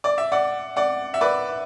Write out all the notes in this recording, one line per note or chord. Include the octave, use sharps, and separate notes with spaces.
D5
E5
D5 F#5
D5 F#5
E5
B4 D5